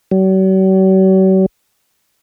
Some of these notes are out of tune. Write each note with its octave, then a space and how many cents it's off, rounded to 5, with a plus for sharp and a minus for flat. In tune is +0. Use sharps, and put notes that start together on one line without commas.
F#3 +45